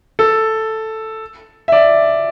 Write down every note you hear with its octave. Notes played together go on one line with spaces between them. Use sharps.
A4
E5
D5